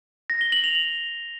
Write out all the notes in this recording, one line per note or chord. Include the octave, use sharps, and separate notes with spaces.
A#6
G7
F#7
F7
F#7